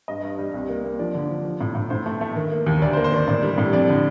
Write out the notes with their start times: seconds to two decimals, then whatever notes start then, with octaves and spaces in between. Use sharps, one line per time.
0.08 G2 D#5
0.23 G2
0.39 G3
0.54 C2
0.69 A#3
0.84 A#3
0.99 F3 D5
1.14 D3
1.29 F3
1.45 F3
1.61 A2
1.75 A2
1.90 A2 C5
2.06 A3
2.21 A3
2.36 D#3
2.52 A#3
2.66 D#2
2.82 D2 D5
2.93 C5
2.97 A#3
3.04 C5
3.12 D#3 D5
3.28 A2 D5
3.43 G3
3.58 A2
3.73 F2 D5
3.88 D3